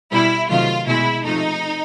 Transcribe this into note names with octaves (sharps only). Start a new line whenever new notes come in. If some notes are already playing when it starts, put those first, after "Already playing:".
B2 G3 E4
C3 D#3 F#3 A3 F4
B2 G#3 E4
C3 F3 A3 D#4